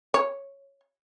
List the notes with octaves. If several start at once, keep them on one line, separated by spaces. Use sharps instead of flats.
C#5